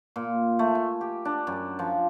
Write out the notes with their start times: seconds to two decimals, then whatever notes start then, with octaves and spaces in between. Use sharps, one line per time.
0.16 A#2
0.59 A3
0.75 G#5
1.01 G4
1.25 D4
1.47 F#2
1.79 F3